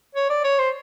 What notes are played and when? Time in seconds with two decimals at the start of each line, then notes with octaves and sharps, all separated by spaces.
0.15 C#5
0.30 D5
0.44 C#5
0.59 C5